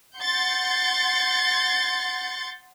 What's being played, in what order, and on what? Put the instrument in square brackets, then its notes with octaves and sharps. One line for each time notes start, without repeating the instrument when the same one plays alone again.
[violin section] F#5 C6 G6 A6 C7 C#7